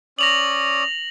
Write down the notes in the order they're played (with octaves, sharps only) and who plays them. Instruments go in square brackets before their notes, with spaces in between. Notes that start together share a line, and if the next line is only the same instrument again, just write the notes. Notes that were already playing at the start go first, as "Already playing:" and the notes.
[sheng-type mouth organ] C#4 D5 D#6 [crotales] A#6 F7 F#7